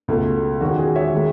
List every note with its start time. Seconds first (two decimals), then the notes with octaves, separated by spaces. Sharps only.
0.08 C#2 B2 A3
0.61 E2 D#3 G#3 C#4 F#4
0.78 G#4
0.96 C#5 E5
1.14 D#3 G#3